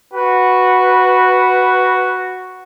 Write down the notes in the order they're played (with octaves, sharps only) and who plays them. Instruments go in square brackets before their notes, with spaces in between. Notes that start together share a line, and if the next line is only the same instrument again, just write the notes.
[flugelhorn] F#4 [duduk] B4